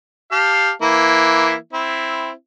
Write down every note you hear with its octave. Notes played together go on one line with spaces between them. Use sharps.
G4 F5 A5
E3 A#3 E4
C4 E4